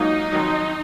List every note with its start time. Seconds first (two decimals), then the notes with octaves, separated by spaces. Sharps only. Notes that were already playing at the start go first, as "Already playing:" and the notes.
Already playing: G#2 F#3 A#3 D#4 F4
0.33 F2 D#3 F#3